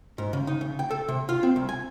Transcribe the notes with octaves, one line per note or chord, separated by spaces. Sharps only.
G#2
C#3
D#4
C#3
G5
A4
C3
F4
C4
C2
G#5